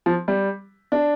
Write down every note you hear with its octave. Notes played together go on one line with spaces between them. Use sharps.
F3
G3
D4